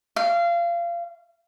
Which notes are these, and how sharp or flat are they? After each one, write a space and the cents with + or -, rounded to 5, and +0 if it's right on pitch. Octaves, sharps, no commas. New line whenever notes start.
F5 -25